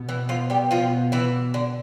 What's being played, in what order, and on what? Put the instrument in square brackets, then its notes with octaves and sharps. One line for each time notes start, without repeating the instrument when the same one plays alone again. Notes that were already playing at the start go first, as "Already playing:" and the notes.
Already playing: [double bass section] B2 B3
[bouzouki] E3 E4
F3 F4
G3 G4
F3 F4
E3 E4
D3 D4